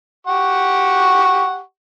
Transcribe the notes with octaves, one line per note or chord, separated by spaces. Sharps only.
G4 F#5 C#6